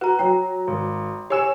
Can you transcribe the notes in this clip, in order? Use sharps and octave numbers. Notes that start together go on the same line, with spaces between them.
F#4 B4 A#5
F#3 G5 A#5
G#1
G4 C#5 G#5 E6 E7